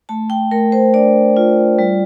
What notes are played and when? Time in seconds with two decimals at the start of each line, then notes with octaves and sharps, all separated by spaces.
0.09 A3 A5
0.30 G5
0.51 A3 A#4
0.72 C5
0.94 D4 D5
1.37 F4
1.79 G3